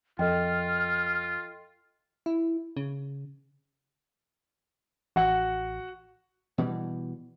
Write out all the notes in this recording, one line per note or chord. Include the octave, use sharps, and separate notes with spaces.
F2 F4 A4 D#5 G5 F6
E4
C#3
A1 F#4 F#5
B2 E3 G3